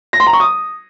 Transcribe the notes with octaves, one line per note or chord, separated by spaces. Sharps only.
A#6
C6
A#5
C#6
D#6